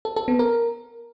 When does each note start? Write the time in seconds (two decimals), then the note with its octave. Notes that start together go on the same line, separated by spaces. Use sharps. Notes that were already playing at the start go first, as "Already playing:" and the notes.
0.05 A4
0.16 A4
0.28 B3
0.39 A#4